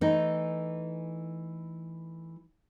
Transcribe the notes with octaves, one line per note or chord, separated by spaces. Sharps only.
E3 A3 D#4